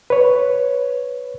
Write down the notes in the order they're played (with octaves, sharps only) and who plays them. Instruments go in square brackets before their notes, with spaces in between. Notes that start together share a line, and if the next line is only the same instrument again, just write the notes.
[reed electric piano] B4 C#5